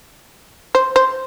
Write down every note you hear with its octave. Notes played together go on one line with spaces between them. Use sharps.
C5
C5